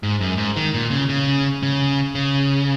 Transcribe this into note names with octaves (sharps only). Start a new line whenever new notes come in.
G#2
F#2
G#2
D#3
A#2
C#3
C#3
C#3
C#3